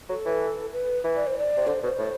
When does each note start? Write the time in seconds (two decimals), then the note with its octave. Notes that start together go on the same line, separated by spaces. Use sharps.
0.09 F#3 A4
0.26 E3
0.72 B4
1.04 E3
1.16 D5
1.27 C5
1.38 D5
1.57 C3
1.67 D3 C5
1.83 B2 C5
1.99 A2